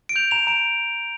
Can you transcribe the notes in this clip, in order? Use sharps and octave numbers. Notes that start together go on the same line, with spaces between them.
D7
G6 F7
A#5 F7
A#5 D7